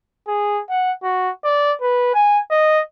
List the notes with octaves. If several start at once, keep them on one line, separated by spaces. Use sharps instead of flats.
G#4
F#5
F#4
D5
B4
G#5
D#5